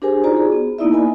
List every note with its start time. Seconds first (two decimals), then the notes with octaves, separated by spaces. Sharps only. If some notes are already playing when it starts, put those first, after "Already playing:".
0.02 D4 G4 G#4 A#4 C5 G#5
0.23 D#4 F4 F#4 C5 D5 A#5
0.37 G#4
0.52 B3
0.78 A#3 B3 D#4 E4 D5 E5
0.93 A#4 D#5 G#5 B5